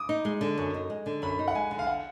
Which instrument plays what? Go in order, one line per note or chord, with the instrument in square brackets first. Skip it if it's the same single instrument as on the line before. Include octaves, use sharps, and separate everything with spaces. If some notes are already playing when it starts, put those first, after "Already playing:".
Already playing: [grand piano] D6 D#6
[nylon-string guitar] D#4
G#3
D3
F#2
D#4
G#3
D3
[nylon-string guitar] F#2 [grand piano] B5
[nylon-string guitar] D#4
[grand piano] F#5
[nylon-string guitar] G#3 [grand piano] G#5
[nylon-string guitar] D3
[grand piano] F5
F#5